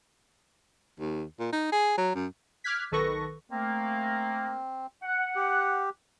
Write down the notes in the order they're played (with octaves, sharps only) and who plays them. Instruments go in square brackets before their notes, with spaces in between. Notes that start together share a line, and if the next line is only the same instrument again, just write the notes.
[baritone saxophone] D#2
A#2
D#4
G#4
F#3
F#2
[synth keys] D6 F6 F#6 G#6 B6
B1 D#3 A4 B4 C#6 A#6
[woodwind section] A3 A#3 [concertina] C4
[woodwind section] F#5
[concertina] G4